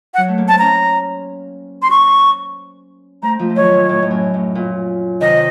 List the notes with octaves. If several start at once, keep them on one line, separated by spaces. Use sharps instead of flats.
F#5
F#3
A3
A#3
C4 A5
A#3 C#4 A#5
C6
C#6
A3 C4 A#5
F3 A3
A3
D#3 F#3 C#5
A#2
A2
A2
F#2
A2
A#2
C3 D#3 D#5